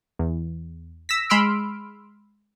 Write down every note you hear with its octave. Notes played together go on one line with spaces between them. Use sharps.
E2
E6 A#6 B6
G#3 B5 C6 E6 F6 D7